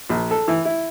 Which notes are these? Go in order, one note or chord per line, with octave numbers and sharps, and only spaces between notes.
A#1
A4
E3
E4